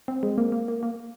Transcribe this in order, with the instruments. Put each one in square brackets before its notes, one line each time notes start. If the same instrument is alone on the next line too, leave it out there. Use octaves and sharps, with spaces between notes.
[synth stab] C4
G#3
A#3
A#3
A#3
A#3